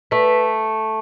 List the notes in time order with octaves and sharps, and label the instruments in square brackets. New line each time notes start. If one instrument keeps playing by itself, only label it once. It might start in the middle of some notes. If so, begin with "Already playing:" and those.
[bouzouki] A3 [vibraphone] B4